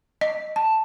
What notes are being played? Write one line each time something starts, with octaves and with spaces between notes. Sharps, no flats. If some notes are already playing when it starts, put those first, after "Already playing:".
D#5
A5